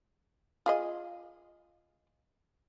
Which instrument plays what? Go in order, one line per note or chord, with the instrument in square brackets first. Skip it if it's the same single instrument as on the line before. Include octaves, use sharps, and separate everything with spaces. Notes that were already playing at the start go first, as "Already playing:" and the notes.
[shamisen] F4 G#4 D#5